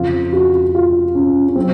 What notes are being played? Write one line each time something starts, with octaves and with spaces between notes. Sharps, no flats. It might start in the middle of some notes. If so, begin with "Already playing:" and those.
Already playing: F2 C#3 F3 F4
F#4
F4
C#4
C#4
F#3 C4